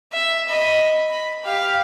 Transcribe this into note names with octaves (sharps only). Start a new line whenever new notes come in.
E5
D#5 B5
B5
G4 F5